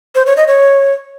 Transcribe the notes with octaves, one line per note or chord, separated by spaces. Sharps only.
C5
C#5
D#5
C#5